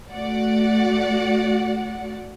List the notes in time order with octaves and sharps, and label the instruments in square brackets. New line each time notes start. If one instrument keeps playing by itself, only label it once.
[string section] A3 F#4 D5 F#5